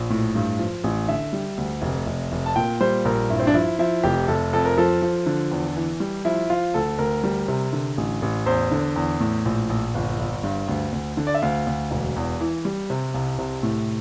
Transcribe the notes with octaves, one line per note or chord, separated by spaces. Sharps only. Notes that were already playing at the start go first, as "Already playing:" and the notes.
Already playing: A#1
A2
G2
F3
A1
D3 E5
G3
D2
F1
F1
F1
A5
A#2 G5
G3 C5
A#1 A#4
G2 E4
C4
D4
F3 E4
F3 E4
F1 G4
F1 A4
F2 A4
A#4
F3 A4
F3
D3
E2
E3
G3
F3 E4
F3 F4
D2 A4
D2 A#4
G3
C3
D3
A1
A1
E2 C5
D3
E2
A2
A#1
A#1
G1
G1
G2
D2
D2
D3
D5
E5
D2 F5
D2
E1
E2
E3
G3
C3
C2
C3
A2